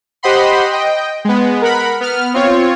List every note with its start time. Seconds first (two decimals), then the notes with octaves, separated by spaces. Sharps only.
0.23 G4 C5 D#5 F#5 B5 C6
0.72 D#5 G5
1.25 G#3 B3
1.62 A#4 F#5 B5
2.01 B3 F6
2.34 C4 F4 C#5